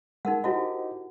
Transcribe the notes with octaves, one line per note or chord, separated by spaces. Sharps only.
G#3 D#4 A#4 F#5
E4 F#4 G4 C5 D#5